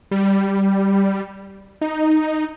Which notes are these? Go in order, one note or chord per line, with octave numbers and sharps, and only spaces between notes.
G3
D#4